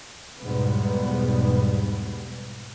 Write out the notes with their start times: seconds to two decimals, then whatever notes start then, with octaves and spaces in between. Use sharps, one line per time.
0.40 B1 E2 G#2 G3 B3